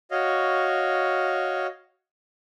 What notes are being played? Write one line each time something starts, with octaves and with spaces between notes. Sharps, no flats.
F#4 C#5 D#5 F5